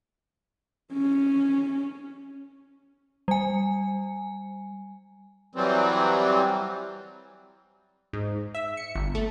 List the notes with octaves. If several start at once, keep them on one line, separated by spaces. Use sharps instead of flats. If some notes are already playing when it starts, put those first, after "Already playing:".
C#4
G3 G#5
E3 F#3 G3 C4
G#2
E5
C#7
G1
A3